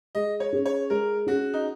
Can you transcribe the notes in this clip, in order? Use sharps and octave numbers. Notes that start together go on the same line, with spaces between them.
G#3 D#5
C#5
C#4 G#4
C#5
G#3 A#4
C#4 F#4 G#4
D#4